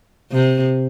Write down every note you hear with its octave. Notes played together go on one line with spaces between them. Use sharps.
C3